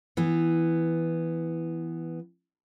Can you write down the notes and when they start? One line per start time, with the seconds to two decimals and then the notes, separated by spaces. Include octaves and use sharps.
0.17 E3 B3